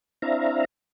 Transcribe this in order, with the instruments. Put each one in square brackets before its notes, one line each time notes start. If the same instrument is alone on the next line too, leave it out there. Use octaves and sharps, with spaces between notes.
[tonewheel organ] C4 D4 E4 E5 F5 A#5